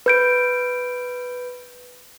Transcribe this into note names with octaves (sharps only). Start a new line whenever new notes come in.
B4 G6 D7